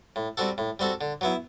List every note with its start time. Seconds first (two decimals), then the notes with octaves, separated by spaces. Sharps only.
0.16 A2
0.37 G3 C4 F#4 A4
0.58 A2
0.79 G3 C4 F#4 A4
1.01 D3
1.21 F#3 B3 E4